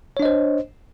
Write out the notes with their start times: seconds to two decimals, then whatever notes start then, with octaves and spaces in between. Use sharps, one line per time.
0.17 C#5
0.20 D4
0.22 D#5
0.25 C5